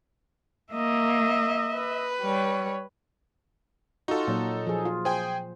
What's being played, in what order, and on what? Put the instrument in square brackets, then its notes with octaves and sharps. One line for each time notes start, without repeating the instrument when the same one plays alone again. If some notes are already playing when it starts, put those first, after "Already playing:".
[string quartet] A#3 [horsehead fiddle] D#5 E5
[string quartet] B4
[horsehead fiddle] G3 C#5
[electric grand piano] D#4 A4 [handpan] F4 F#4
[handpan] A#2 F#3
F3 G#4
F4
[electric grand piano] G#4 G5 G#5 [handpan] C5